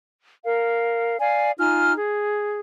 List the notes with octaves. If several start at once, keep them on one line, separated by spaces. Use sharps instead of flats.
A#4 F5
D5 F5 G#5
D#4 F4 G#5 F6
G#4